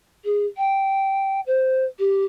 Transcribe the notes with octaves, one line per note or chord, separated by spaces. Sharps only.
G#4
G5
C5
G4